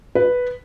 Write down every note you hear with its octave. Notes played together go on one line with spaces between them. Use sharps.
B4